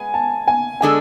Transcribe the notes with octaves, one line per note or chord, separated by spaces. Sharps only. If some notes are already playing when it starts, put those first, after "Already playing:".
Already playing: G#3 B3 G#5
A5
G#5
D3 G#3 D4 A4 G#5